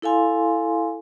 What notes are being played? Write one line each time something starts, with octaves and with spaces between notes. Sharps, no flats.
E4 A4 F5 G#5 C6